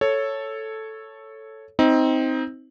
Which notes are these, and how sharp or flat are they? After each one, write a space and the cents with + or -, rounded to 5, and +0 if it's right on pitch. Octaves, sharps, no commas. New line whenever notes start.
A4 +0 C#5 -5
C4 +0 D#4 +20